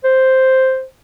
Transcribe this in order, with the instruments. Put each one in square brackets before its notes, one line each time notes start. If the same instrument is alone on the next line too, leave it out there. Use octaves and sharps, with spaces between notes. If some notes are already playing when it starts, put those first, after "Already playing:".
[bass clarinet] C5